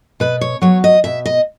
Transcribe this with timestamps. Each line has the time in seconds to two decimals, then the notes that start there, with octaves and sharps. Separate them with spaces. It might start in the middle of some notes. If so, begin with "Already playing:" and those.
0.20 B2 B4
0.41 C#5
0.62 F#3 B3 C#5
0.84 D#5
1.04 B2 E5
1.26 D#5